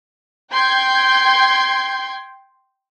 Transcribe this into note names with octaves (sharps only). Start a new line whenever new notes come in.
G5 C6 G6 G#6